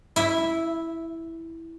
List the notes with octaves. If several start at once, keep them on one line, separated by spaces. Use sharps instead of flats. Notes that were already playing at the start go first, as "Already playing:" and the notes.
E4 E5